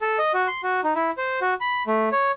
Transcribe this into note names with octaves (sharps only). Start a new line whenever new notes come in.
A4
D#5
F#4
C6
F#4
D#4
E4
C5
F#4
B5
A3
C#5